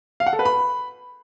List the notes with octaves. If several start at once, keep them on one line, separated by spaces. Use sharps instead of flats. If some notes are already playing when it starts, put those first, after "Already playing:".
F5
F#5
A4
B4
B5